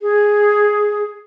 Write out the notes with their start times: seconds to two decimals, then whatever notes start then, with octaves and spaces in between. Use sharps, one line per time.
0.02 G#4